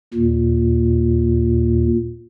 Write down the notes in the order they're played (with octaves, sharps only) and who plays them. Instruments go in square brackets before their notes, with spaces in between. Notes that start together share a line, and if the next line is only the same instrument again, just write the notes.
[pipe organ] D#2 A#2